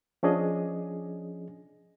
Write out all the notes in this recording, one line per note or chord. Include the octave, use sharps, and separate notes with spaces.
F3 C#4 D4 G#4 D#5